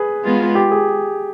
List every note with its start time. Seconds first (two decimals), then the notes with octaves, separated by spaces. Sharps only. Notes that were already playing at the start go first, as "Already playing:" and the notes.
Already playing: G#4 B4
0.24 G#3 B3 F4
0.55 G4
0.71 G#4